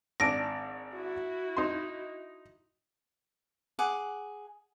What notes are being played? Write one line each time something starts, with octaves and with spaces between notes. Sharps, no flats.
G#1 D4 A#6 D7
E4 F#4
D#4 C6
G#4 F#5 D6